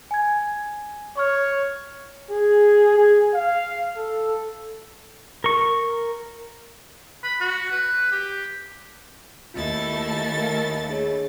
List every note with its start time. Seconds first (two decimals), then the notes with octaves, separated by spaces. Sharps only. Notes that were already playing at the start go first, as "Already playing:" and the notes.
0.11 G#5 G#6
1.17 C#5 C#6 F6
2.31 G#4
2.97 G#4
3.34 F5
3.97 A4
5.44 A#4 C#6
7.24 B5
7.40 F#4
7.71 B4
8.12 G4
9.54 D#2 A3 E4 F4 A4 A6
10.38 A#4 F5
10.89 D4 G#4 C#5